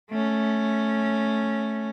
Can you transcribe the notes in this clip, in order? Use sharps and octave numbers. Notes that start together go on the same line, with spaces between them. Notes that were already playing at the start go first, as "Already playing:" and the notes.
A3 C#4